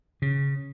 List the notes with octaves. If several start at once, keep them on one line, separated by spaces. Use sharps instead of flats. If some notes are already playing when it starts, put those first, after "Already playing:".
C#3